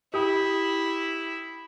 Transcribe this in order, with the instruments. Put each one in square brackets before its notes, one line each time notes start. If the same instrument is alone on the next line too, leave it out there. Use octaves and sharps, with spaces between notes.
[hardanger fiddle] E4 [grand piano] G4 D#6